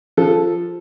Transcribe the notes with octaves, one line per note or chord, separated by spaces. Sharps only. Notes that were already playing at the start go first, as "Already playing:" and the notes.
F3 A4